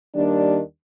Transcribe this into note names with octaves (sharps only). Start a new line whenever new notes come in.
D#2 D#3 G3 D4